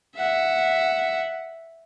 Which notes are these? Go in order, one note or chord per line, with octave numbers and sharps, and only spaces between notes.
E5 F#5